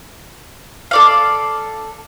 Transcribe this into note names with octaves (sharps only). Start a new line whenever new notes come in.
A4 D5 F5